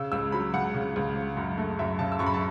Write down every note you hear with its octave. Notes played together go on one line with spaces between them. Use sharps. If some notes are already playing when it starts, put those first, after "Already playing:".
Already playing: C#3 E6
C#2 E6
F#3 B5
C#2 F#5
C#3
C#2
C#3
F#2
A3
F#2 E5
C#3 A5
E6
F#2 C#6
B5
A5